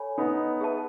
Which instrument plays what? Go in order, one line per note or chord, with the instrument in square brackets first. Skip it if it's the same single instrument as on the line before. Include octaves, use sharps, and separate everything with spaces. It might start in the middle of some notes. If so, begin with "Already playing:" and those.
Already playing: [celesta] A4 C#5 G#5 B5
[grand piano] B3 D#4
[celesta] G#4 B4 E5 A5